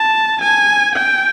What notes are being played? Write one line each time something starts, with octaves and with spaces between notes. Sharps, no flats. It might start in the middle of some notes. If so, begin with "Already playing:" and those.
Already playing: A5
G#5
G5